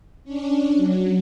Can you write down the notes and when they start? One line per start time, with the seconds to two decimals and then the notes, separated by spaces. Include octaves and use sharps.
0.24 C#4 D4
0.76 F#3